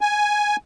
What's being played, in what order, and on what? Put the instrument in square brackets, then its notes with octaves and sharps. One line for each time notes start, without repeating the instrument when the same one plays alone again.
[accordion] G#5